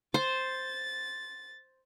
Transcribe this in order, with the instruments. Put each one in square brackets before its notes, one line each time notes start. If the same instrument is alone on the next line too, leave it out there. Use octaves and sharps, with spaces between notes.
[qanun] C5 [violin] A6